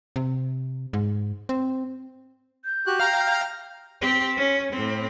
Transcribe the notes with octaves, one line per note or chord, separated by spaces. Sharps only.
C3
G#2
C4
G6
F#4 G4 F#6
F5 G5 A#5 F6
C4 G4
C#4
A2 C4